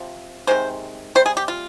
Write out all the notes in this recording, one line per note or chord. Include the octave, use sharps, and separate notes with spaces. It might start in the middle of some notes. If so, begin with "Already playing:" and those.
Already playing: C3 F3
C3 D#3 G#3 C5
C3 G3 C5
G#4
G4
F4